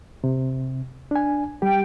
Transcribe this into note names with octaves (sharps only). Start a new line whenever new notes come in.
C3
D4 G#5
G3 G4 G5